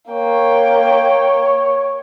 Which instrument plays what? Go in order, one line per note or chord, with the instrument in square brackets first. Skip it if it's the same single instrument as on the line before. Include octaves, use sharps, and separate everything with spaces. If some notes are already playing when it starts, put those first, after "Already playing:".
[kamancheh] A#3 G5 [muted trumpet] C#5